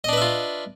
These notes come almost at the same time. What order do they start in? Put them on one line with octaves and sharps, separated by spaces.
D#5 D4 B4 E5 F4